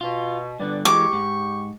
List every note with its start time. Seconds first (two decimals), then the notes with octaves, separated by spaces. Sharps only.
0.01 B2 F4
0.60 G2 D3 D4 B4 D5
0.85 E3 G#3 G4 C#6 D6
1.13 G#2